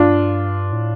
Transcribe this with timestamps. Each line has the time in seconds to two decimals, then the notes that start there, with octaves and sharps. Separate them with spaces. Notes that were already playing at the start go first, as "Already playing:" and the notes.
Already playing: G2 D4 F4
0.73 A2